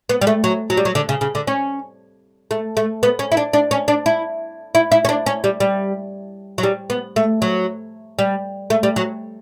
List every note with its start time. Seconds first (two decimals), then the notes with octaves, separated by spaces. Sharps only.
0.09 B3
0.21 G3
0.27 A3
0.44 F#3
0.70 F#3
0.77 G3
0.85 F#3
0.95 D3
1.09 C#3
1.21 C#3
1.35 D3
1.47 C#4
2.51 A3
2.77 A3
3.03 B3
3.19 C#4
3.32 E4
3.37 D4
3.53 D4
3.71 C#4
3.88 D4
4.06 E4
4.75 E4
4.92 E4
5.05 C#4
5.09 D4
5.26 C#4
5.44 G3
5.60 G3
6.58 F#3
6.63 G3
6.90 B3
7.16 A3
7.42 F#3
8.19 G3
8.70 A3
8.83 G3
8.96 F#3